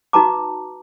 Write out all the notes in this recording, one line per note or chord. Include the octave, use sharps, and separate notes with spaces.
D#4 F#4 B4 A5 A#5 D6